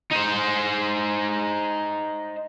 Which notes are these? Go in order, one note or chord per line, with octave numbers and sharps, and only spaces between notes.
D#4 C5